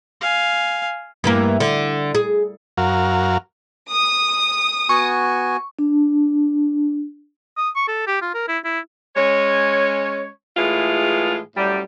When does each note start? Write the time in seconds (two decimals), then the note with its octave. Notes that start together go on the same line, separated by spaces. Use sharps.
0.21 F5 G#5
1.24 G2 E3 A#3
1.60 D3
2.15 G#4
2.77 F#2 F#4 A#4 F5
3.92 D#6
4.89 B3 F#4 G#5 C#6
5.79 D4
7.57 D#6
7.76 C#6
7.88 A4
8.07 G4
8.22 F4
8.34 A#4
8.48 E4
8.65 E4
9.16 G#3 C#4 C#5
10.56 A2 E3 G#3 F4 G#4
11.56 F#2 A2 G3